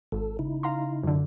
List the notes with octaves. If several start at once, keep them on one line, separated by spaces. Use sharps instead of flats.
G#1 A4
C#3 D#4 E4
F5 A#5 C6
F#2 D3